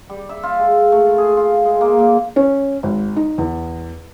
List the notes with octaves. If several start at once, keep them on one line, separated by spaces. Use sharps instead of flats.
G3
E5
F4
G#3
A3
G#4
F4
G#3
A#3
A#2
C#4
G#1
D#4
E2